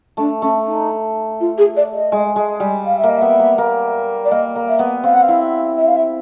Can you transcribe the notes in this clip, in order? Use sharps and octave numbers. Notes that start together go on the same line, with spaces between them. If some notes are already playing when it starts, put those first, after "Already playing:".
A3 D4
A3 C#4
D#4
F4
G#4
D5
D#5
G#3
G#3
G3
F5
E5
A#3 D#5
B3 E5
A#3
A#3
D5
A#3 D#5
A#3
E5
B3
C4 F5
F#5
F5
E4
E5
F5
E5